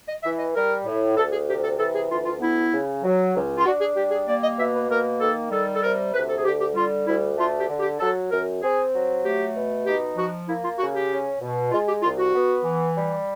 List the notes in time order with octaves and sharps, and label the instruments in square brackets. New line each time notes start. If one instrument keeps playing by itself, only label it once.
[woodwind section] D#5
E3 E5
D#5
G3 A#4
A2
D2 A4
G#4
C3 G4
A4
E3 A4
G#4
D2 F4
F4
B3 E4
C#3
F#3
C#2
F4
D4 F#4
G#4
G3 G4
G#4
A#3 D5
D#5
B2 E5
B4
A#3 A#4
D#3 A4
G3 A4
A4
C3 A#4
D2 B4
A4
G#4
D3 G4
G4
G3 F4
D2 E4
A3 F4
G4
D3
G4
F#3 A4
F#2 A#4
C4 G#4
F#3
A3 G4
B2
D#4 G4
F3 F#4
A#3 E4
F4
C#3 F#4
G4
C#4
B2
G#3 F4
G4
C2 F4
F#4
B3
E3
G3